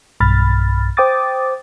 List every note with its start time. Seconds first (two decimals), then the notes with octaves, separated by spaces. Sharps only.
0.20 B1 G2 B5 F6 A6
0.97 C5 G5 D6 D#6 A6